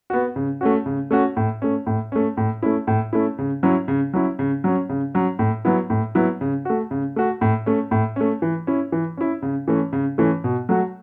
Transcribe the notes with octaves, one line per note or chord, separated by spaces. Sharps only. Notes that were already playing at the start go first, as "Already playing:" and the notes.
B3 F#4
C#3
A3 C#4 F#4
C#3
A3 C#4 F#4
A2
A3 C#4
A2
A3 C#4
A2
A3 C#4 E4
A2
A3 C#4 E4
C#3
F#3 C#4 E4
C#3
F#3 C#4 E4
C#3
F#3 C#4
C#3
F#3 C#4
A2
F#3 B3 E4
A2
F#3 B3 E4
C#3
A3 F#4
C#3
A3 F#4
A2
A3 C#4
A2
A3 C#4
E3
C#4 E4
E3
C#4 E4
C#3
E3 A3 C#4
C#3
E3 A3 C#4
B2
F#3 A3 F#4